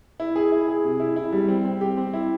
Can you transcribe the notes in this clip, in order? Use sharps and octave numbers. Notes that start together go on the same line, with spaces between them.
E4
G#4
E4
G#4
C3
E4
E4
G3
C4
C4
G4
C4
E4